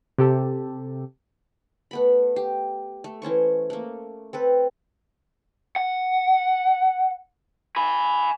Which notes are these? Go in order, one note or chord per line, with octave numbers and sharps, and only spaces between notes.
C3 G4 A4
A3 B3 B5
G4
A3
E3 C#4 C5 C#6
A3 A#3
C4 A4 B4
F#5
G#5 B5